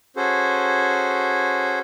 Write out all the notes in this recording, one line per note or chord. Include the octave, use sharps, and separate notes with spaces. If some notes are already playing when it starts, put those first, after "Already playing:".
C#4 F#4 G#4 A4 C5